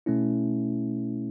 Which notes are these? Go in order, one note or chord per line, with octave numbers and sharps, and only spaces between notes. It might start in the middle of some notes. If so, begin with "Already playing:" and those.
B2 A3 C#4 E4